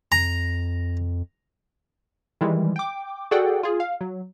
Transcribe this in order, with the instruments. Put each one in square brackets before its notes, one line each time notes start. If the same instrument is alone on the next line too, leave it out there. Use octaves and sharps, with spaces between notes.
[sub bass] F2 [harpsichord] A#5
[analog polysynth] D#3 E3 G3 G#3
G5 D6
F#4 G#4 A4 D5 F#5 G5
F4 G#4
F5
F#3